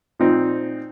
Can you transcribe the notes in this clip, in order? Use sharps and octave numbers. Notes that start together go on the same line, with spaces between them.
A#2 F3 C4 D#4